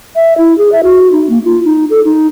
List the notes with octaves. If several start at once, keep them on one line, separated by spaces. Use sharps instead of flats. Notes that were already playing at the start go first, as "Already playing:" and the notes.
E5
E4
G#4
E5
F#4
D#4
A#3
F4
D#4
A4
D#4